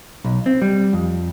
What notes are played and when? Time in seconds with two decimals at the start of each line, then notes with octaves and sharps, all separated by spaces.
0.24 B1
0.46 C4
0.62 G3
0.93 F2